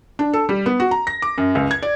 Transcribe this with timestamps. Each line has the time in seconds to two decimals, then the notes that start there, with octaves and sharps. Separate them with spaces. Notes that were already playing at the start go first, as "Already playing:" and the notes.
0.19 D4
0.34 A4
0.49 G3
0.66 B3
0.80 F#4
0.91 A#5
1.07 A#6
1.22 D6
1.38 F#2
1.55 C#2
1.71 G#6
1.83 D5